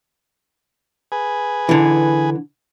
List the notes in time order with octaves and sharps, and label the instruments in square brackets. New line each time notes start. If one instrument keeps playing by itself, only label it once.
[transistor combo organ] G#4 B4 G#5
[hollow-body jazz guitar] D3 E3